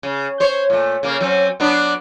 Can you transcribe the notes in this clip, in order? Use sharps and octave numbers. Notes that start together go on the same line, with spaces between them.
C#3
C5 C#5
A#2 A3
C#3 A#3
F#3 C4 C#4
F#3 B3 D4